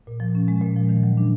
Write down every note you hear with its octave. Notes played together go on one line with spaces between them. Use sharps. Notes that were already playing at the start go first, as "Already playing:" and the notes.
A#2
F3
C#4
G#3
A#2
F3
D#3
F#3
D4